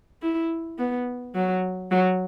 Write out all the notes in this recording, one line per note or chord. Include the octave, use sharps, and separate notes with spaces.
E4
B3
F#3
F#3